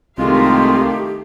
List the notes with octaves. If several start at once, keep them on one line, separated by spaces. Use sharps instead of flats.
C2 D#3 G#3 A3 F4 G4 F5